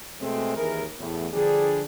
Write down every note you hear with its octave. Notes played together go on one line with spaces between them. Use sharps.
B2 G#3 A3 C4
D#2 E3 G#3 E4 G#4 A#4
E2 A2
D3 F3 G3 D4 G#4